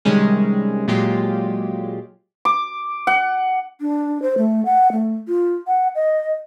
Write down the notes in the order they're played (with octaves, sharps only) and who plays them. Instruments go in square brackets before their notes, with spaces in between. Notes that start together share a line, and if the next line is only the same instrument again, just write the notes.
[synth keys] C3 D#3 G3 G#3 C#4 G#4
A#2 F#3 G#3 F4 G4
[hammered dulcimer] D6
F#5
[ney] D4
C5
A3
F#5
A3
F4
F#5
D#5